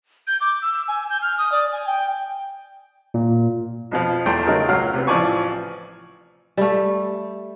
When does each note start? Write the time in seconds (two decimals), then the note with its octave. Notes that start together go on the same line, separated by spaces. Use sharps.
0.27 G6
0.41 D6
0.62 E6
0.88 G#5
1.10 G6
1.22 F6
1.38 D#6
1.52 D5
1.72 G#5
1.87 G5
3.14 A#2
3.91 F2 B2 F3
4.26 E2 A3 G5 A#5 C6
4.46 C#3 F#3 A3 D#4 G#4 A#4
4.68 C#2 F#3 C#5 F5 F#5 F6
4.94 C3 B3
5.07 A1 E3 F3 D5 G#5 C#6
6.57 G3 A3